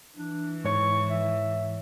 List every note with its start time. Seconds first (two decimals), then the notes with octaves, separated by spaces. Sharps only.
0.15 E3 D4
0.64 G#2 C#5 C#6
1.09 E5